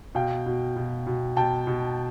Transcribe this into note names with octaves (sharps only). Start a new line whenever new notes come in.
B2 F5 G5
B2
B2
B2
B2 G5 A5
B2